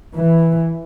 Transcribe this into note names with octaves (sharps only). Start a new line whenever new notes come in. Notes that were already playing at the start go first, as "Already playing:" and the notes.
E3